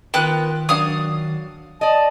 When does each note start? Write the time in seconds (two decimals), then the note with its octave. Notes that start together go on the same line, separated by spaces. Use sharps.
0.14 D#3 B3 F4 A#4 G5 F#6
0.69 F#3 D4 F5 D#6
1.81 D5 D#5 A5